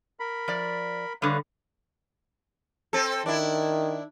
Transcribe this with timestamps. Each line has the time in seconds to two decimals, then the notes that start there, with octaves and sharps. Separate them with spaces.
0.20 A#4 B5
0.48 F3 D5
1.22 D3 G3 B4 C#5 F5
2.93 C4 A4
3.26 D#3 D4 E4